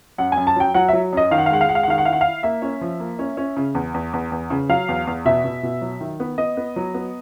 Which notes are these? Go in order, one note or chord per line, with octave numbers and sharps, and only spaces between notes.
F#2 F#5
G#5
F#2
A5
F#3 G5
F#3 F#5
F#3 E5
F#2 D#5
D#3 F5
F#5
F5
G#3 F#5
F5
G#3 F#5
F5
F#5
D#3 F5
F#5
E4 F5
F#5
E4 F5
A#3 E5
C#4
F3
A#3
C#4
C#4
C#3
E2
E2
E2
E2
C#3
F#3 F5
E2
E2
B2 E5
B2
B2
F#3
D#3
B3
B3 D#5
B3
F#3
B3